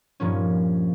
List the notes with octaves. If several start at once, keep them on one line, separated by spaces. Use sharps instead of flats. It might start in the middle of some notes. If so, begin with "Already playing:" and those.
G2 A#2 F3 C#4